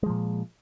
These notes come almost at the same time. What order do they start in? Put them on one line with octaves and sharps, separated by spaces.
G#3 F3 A#2